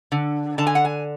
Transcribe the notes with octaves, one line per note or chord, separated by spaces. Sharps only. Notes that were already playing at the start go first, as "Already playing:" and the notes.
D3
D3 A5
G#5
F#5
G#5